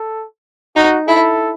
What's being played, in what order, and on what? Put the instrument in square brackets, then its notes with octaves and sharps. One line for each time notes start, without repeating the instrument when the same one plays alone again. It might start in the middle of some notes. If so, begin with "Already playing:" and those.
Already playing: [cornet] A4
[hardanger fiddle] D#4 [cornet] F#4
[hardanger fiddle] E4 [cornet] A4